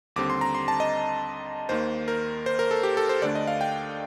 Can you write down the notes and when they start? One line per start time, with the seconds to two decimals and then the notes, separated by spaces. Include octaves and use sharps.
0.16 D#2 D3 G3 C4 D6
0.30 C6
0.41 A#5
0.55 C6
0.68 A5
0.80 D#5
1.69 D#2 D#3 A#3 C5
2.08 A#4
2.46 C5
2.59 A#4
2.71 A4
2.83 G4
2.97 A4
3.09 C5
3.22 D2 D3 A3 D4 D5
3.35 D#5
3.47 F5
3.61 G5